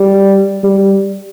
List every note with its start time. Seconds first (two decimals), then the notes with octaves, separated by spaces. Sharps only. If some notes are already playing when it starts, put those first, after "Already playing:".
Already playing: G3
0.63 G3